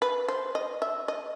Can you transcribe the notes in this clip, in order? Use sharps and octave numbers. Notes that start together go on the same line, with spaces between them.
B4
C5
D#5
E5
D#5